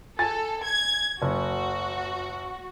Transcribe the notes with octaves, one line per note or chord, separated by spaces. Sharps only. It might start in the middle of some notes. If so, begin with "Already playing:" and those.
A4 G#5 A6
G#6
F#1 F#4